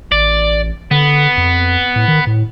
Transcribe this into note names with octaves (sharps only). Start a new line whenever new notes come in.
A1 D5
D3 B3
F2
A2
D#3
A2